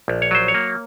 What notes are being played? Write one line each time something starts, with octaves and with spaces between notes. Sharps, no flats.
A#1
C#5
F#3 C5
C#5
A#3